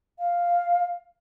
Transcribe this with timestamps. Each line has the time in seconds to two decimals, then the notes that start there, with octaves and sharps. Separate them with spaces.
0.19 F5